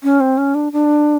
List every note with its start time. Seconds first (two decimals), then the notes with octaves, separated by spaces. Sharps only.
0.03 C#4
0.21 C4
0.38 C#4
0.55 D4
0.73 D4